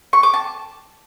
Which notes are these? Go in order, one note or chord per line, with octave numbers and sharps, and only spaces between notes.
C#6
D6
A5